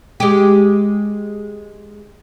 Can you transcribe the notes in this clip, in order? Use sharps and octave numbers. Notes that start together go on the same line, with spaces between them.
G#3 G4